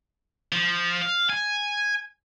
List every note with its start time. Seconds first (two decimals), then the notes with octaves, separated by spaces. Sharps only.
0.52 F3
1.02 F5
1.30 G#5